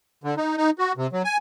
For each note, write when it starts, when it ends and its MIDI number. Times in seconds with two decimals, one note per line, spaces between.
0.24 0.35 50
0.37 0.56 63
0.57 0.70 63
0.79 0.92 66
0.97 1.07 48
1.13 1.22 54
1.25 1.37 80